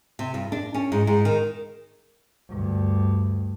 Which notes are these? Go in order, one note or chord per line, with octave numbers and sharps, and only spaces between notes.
C3
G2
D4
C#4
G#2
G#2
D#3
D2 G2